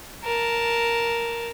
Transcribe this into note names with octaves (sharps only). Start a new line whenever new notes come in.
A#4 A5